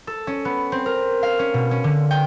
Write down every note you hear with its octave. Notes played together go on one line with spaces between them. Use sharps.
A4
C#4
B3
C4
A#4
F5
C#4
B2
C#4
D3
G5